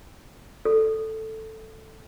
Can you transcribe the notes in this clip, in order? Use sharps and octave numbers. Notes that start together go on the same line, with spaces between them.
A4